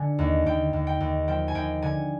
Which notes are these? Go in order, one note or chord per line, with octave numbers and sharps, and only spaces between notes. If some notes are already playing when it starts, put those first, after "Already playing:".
Already playing: D3 G#5
D#2
D#2 G5
D#2
G5
D#2
F3 G5
G#5
D#2 G5
D3 G#5